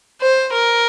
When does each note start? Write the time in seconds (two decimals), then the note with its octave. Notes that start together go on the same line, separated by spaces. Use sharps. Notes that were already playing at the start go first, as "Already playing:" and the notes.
0.21 C5
0.52 A#4